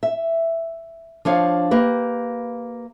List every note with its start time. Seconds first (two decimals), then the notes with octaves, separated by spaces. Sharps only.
0.03 E5
1.25 F3 D4 C#5 F5
1.71 A#3 G4 B4